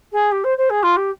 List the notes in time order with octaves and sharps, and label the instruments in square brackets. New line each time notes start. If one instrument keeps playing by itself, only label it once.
[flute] G#4
G4
C5
C5
G#4
F4
G4